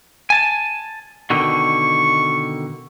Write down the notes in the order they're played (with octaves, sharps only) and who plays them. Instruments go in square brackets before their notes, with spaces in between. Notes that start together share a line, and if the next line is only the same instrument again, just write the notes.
[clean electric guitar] G#5 A5
[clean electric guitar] B2 D3 D#3 [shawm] C#6